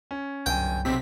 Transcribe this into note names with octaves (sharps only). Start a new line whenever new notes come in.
C#4
G1 C2 F#2 G5 G#5
B1 C3 C4 B6